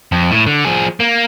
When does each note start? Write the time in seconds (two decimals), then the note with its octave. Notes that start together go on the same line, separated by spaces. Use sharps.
0.12 F2
0.31 A2
0.47 D3
0.65 F3 G#4
1.00 A#3